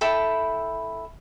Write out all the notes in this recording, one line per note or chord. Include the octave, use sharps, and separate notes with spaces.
E4 A4 G5 B5